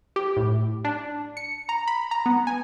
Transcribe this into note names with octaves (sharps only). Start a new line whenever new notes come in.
G4
A2
D4
C#7
A#5
B5
A#5
B3
G#5